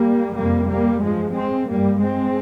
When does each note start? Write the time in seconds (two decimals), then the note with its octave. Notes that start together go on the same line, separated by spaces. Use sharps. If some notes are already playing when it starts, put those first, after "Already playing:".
Already playing: G3 A#3
0.36 F2 C3 G3 A#3
0.69 G3 A#3
1.02 G2 F3 G#3
1.35 G#3 C4
1.68 G2 G3 A#3
2.00 G#3 C4